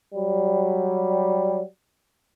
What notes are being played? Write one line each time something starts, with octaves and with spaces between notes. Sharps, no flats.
F#3 G3